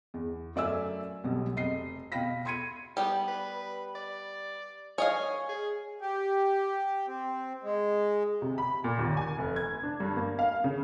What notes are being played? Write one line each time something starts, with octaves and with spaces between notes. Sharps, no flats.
E2
F#2 A3 D5 E5 G#5 E6
B1 B2 F#3 G3
F1 D#5 C7
B2 F5 G5 B5 A#6 B6
B5 C6 G#6 C#7 D#7
G3 B3 G4
B4
D5
C#5 D#5 F5 G#5
G#4
G4
C4
G#3
C3
B5
A#2
D#2
G#5
F1
G#6
D4
G2
A#3
F5
C#3